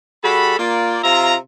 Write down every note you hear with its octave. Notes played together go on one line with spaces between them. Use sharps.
G3 F#4 G#4 A4 B5
A#3 F4 D5
C3 F4 E5 A#5